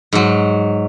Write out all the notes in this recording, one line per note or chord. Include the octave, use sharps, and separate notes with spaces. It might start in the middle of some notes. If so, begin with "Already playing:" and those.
G#2 F#3